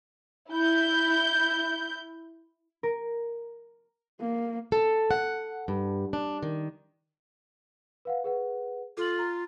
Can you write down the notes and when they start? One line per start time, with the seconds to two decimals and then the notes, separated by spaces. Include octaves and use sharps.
0.51 E4 G6
2.83 A#4
4.20 A#3
4.72 A4
5.11 F#5
5.68 G2
6.13 D4
6.43 D#3
8.05 B4 F5 F#5
8.24 G#4 B4 F#5
8.97 F4 A4 F#7
9.19 A#5